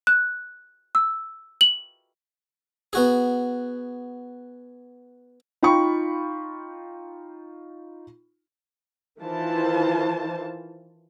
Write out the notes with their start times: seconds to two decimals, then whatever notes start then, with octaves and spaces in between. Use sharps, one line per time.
0.07 F#6
0.95 E6
1.61 F#7
2.93 B3 F#4 G#4
5.63 D#4 F4 G5 B5 C#6
9.22 D#3 E3 F4 C5 A5